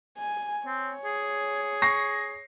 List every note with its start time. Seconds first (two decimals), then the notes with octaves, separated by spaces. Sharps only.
0.18 G#5
0.66 C4 C#5
1.05 G#4
1.82 C#6 A#6 C7